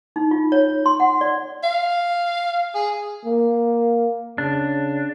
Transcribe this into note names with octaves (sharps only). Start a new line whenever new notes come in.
D#4
F4
C#5
C6
F#5
D5
F5
G#4
A#3
C#3 D4